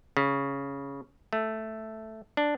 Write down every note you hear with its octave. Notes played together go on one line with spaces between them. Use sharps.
C#3
A3
D4